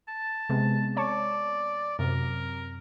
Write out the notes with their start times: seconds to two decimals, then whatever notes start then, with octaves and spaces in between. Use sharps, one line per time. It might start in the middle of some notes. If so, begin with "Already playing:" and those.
0.08 A5
0.49 C3 G#3 B3
0.97 C#5 D5 A5 C#6
1.99 F#2 C3 F#3 A#4